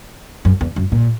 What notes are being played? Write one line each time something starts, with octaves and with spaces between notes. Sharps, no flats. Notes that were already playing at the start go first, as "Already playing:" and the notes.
F#2
E2
F#2
A#2